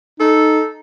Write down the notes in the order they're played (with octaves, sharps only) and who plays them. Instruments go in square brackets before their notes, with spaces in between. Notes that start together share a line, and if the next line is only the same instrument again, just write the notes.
[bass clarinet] D#4 [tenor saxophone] A4